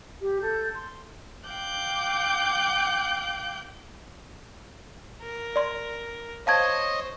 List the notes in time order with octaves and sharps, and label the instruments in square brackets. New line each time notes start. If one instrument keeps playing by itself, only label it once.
[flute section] G4
A4 G6
C6
[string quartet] F5 G5 D6 F#6 G6
[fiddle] A#4
[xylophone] D5 C6
[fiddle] C5 [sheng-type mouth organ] C#5 D#5 [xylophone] F5 A5 G#6